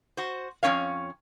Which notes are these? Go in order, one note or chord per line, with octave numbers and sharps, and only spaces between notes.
F#4 C5
F2 F3 C#4 C#5 F5